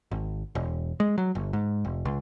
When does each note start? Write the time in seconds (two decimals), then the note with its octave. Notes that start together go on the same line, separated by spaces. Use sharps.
0.11 G#1
0.55 E1
1.00 G#3
1.18 F#3
1.35 G1
1.53 G#2
1.85 F1
2.05 C#2